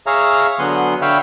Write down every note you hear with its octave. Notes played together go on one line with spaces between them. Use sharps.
G#4 C#5 E5 F5 A#5
D3 F#3 B3 F#5 G#5 C6
D3 C#5 E5 F5 G5 B5